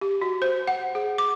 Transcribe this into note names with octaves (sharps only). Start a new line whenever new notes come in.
G4
F#4
C5
F#5
G#4
D6